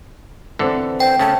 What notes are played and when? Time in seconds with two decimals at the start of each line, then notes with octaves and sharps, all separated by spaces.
0.59 D3 E3 B3 C4 A4
1.00 C5 G5
1.19 C#3 A3 C#4 A5